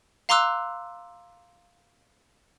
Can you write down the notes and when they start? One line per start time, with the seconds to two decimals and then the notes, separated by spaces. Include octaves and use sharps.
0.29 F5 A#5 C6 D6 E6 F#6